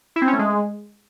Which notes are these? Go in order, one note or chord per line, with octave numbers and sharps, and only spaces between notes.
E4
C4
C#4
A3
G#3